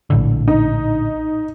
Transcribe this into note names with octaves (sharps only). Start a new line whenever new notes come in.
A#1 A2 D3
D#4